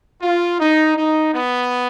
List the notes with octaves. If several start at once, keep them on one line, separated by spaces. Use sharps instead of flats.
F4
D#4
D#4
B3